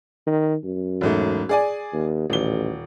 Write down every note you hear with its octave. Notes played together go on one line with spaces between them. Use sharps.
D#3
F#2
E1 G#2 A3
G#4 D5 G#5
D#2
D#1 A1 G7